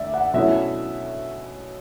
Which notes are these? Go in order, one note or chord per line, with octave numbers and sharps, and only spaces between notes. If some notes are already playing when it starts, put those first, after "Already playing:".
Already playing: D2 D5 E5
F#5
B2 F#3 A3 C#4 E4 E5